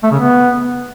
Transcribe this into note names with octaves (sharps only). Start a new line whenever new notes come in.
A3
C#3
B3